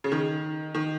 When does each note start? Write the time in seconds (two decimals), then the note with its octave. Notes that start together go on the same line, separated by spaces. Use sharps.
0.04 C#3
0.12 D#3
0.75 D#3